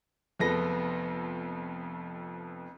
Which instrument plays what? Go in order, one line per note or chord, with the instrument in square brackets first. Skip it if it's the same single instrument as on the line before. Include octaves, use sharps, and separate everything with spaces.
[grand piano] F1 F2 B3 A4 A#6